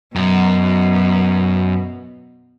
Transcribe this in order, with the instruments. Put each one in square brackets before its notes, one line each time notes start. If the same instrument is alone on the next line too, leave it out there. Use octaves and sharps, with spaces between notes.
[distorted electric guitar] F#2 [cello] B2